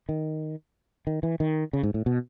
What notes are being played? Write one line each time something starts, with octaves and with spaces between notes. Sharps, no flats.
D#3
D#3
E3
D#3
C#3
G#2
A2
B2